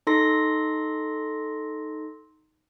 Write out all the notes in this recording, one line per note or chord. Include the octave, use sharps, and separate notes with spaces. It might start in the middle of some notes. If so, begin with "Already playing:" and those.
D#4 A4 C6 A#6